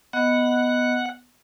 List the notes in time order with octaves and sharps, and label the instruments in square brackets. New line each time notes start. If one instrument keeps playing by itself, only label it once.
[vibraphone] B3 D#5 [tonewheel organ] F#5